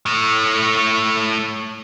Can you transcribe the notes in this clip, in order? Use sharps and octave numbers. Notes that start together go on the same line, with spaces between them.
A2 A3